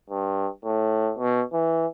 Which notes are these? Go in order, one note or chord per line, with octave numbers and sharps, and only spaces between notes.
G2
A2
B2
E3